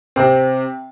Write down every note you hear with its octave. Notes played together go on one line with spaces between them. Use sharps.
C3 C4